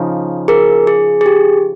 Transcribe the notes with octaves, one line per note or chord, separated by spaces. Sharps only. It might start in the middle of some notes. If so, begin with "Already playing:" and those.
Already playing: C#3 F3 D#4
G#4 A#4
G#4
G#4
G4